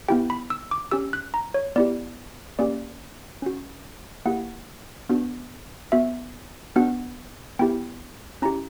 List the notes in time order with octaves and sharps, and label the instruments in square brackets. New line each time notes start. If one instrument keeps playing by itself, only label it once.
[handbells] B3 E4 G4 G5
B5
E6
D6
C#4 G4 E6
F#6
A#5
C#5
B3 E4 G4 D5
A#3 C#4 G4 D5
C#4 F#4
A#3 E4 G4 F#5
B3 D4 F#4
B3 F#4 E5
B3 D4 F#4 F#5
B3 E4 G4 G5
C#4 E4 G4 A#5